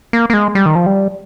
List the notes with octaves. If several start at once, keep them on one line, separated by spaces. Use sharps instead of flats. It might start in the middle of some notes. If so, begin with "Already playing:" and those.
A#3
A#3
G#3
G3
D#3
F3
G3